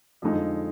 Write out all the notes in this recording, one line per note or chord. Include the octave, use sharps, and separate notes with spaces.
F2 D3 G#3 D#4